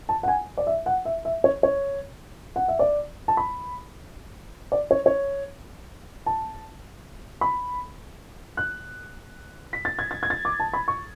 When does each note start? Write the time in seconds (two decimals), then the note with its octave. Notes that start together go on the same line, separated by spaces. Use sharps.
0.09 A5
0.23 F#5
0.28 G#5
0.57 D5
0.67 E5
0.86 F#5
1.05 E5
1.25 E5
1.44 C#5
1.63 C#5
2.56 F#5
2.68 E5
2.79 D5
3.28 A5
3.37 B5
4.72 D5
4.91 C#5
5.06 C#5
6.26 A5
7.41 B5
8.57 F#6
9.73 B6
9.85 A6
9.99 G#6
10.11 A6
10.23 G#6
10.30 A6
10.45 D6
10.60 A5
10.73 B5
10.88 C#6